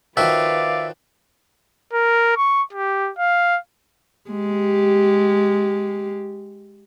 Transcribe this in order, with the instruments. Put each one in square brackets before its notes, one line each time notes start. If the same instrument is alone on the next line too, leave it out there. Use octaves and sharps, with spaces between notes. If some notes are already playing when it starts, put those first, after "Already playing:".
[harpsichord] D#3 F3 F#4 [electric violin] B4 F5 [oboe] D5 [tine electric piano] E5
[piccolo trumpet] A#4
C#6
G4
F5
[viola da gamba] G#3 G4